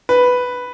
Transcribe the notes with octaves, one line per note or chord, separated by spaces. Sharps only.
B4